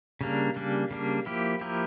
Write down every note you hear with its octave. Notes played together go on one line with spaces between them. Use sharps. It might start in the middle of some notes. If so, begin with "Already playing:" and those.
C#3 G3 A#3 D4
C#3 G3 A#3 D4
C#3 G3 A#3 D4
F3 A#3 E4 G4
F3 A#3 E4 G4